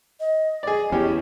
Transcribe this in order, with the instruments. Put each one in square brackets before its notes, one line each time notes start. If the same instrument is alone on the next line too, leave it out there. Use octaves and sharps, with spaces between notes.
[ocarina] D#5
[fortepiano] G#4 D5
[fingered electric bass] E2 [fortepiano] C#4 G4